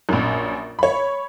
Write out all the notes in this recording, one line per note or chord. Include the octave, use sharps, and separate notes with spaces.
A#1 F#2
C#5 B5